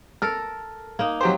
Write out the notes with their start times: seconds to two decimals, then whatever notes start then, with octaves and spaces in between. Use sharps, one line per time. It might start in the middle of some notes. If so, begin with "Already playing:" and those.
0.22 A4 A#4 F6
0.99 A#3 D#4
1.21 F#3 G4 C5